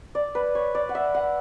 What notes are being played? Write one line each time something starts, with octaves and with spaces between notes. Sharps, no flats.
D5
B4
C#5
D5
F#5
E5
F#5